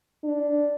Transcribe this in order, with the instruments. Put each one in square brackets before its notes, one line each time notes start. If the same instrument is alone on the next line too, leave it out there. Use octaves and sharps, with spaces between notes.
[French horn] D4